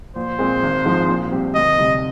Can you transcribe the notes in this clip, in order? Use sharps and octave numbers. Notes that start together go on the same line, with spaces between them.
A#1 C5
A#2 G#3 C4
G#1
G#2 F3 G#3 C4
A#2
G3 C4 G4
D2 D#5
C3 G3